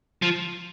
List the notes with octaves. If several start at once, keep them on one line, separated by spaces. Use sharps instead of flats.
F3